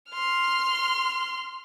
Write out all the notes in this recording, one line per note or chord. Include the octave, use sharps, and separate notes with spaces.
C6 F6